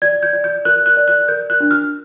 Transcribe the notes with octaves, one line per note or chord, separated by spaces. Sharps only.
D5 G#6
G6
D5
G6
A#4 F#6
F#6
D5
F#6
A#4 G6
F#6
D4
F6